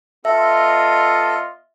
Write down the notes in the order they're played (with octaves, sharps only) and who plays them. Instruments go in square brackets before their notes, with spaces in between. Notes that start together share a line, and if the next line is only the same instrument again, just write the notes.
[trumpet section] B3 F4 D#5 [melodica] A4 [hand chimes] E5